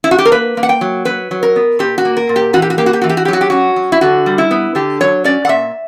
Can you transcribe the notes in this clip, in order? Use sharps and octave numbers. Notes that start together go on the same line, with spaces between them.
E4
F#4
G4
A#4
A#3 B4
A#3
F#5
G5
F#3
F#3 B4
F#3
A#4
B3
A#2 G4
F#4
A#3
A#4
A#2
G4
E3 F#4
G4
F#4
A#3 G4
F#4
G4
E3 F#4
G4
F#4
G4
F#3 F#4
G4
C#4 F#4
F#3
E4
D3 F#4
G3
E4
B3
D3 G4
F#3 C#5
C#4 D5
F#5
A#2 E5